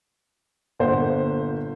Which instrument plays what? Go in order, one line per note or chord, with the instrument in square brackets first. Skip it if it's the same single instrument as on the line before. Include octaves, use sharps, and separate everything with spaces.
[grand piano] G1 A#2 C5 F#5